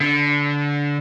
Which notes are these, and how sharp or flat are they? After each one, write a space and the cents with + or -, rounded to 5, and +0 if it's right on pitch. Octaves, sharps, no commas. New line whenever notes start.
D3 -20